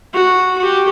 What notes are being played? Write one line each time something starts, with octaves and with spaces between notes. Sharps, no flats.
F#4
F#4 G4